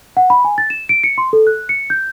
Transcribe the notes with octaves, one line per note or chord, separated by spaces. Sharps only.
F#5
B5
G#5
A6
E7
D7
C#7
C6
A4
F#6
C#7
G6